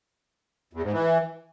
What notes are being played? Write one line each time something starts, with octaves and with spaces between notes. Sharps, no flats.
E2
G#2
E3